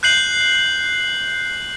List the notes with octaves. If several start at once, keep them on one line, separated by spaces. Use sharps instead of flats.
F#6 G6 C7 F#7